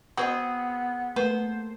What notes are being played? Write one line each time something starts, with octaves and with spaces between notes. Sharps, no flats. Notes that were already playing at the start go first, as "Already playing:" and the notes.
B3 C4 F#4 G#4 C5 D#5
A3 A#3 B4 C5